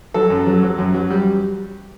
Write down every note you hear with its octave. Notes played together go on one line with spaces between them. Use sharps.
F#3 A4
F#2
F#3
F#3
F#2
F#3
G3